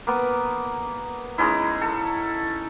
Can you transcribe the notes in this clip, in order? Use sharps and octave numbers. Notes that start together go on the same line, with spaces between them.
A#3 B3
G#3 C#4 D#4 E4
A4